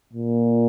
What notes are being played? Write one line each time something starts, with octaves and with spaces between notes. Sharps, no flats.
A#2